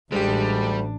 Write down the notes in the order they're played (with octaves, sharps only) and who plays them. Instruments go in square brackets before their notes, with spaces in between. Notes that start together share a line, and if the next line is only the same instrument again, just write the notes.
[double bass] A1 D4 [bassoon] D2 [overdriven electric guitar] G3 [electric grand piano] G#3 G4